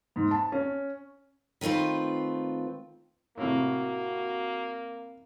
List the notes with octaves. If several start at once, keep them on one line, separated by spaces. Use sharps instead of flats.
G#2
A5
C#4
D#3 A3 C4 F4 B4
A2 C3 A#3 F#4